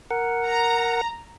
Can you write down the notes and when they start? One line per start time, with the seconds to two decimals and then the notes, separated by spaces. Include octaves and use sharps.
0.11 A#4 F#5
0.45 A#5